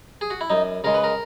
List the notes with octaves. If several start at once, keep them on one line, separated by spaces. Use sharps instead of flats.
G#4
F#4
E4
F#2 D#4
C#3 G#3 A#4
B4
A#4